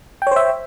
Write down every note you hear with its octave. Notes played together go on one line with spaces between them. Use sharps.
C5 C#5 E5 G5